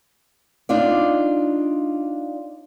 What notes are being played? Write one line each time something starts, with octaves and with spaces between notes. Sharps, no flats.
D4 D#4 F4 D5